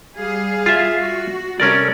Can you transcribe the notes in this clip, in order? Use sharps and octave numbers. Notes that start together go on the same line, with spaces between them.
G3 G#4 F5
F4 E5
F#4
C3 G3 C#4 A4 A#4 D5